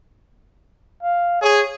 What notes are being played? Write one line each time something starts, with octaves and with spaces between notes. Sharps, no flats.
F5
G#4 C#5